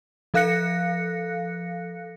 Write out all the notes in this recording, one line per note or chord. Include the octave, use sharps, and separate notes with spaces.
F3 A4 F5 F#6 A#6 C#7